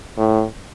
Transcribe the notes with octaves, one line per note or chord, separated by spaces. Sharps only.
A2